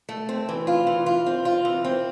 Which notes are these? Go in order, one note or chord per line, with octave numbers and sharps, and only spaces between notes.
A3
C4
E3
F4
E3
F4
C4
F4
E3
C4